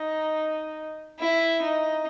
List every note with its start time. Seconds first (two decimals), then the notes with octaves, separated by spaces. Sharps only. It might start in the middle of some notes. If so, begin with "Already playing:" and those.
Already playing: D#4
1.19 E4
1.62 D#4